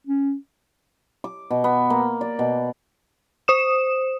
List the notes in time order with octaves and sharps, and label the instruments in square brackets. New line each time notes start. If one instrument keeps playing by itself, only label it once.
[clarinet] C#4
[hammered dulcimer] D6
B2
B3
A#3
D5
B2
[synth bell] C5 D#6 E7